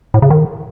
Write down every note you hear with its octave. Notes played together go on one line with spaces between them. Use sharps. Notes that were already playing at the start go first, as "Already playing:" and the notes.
A2
C#3
D#3